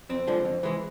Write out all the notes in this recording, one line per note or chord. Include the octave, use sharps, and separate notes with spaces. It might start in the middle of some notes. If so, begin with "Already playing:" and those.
F2 C4
D3 F3 G#3
F2
E3 G#3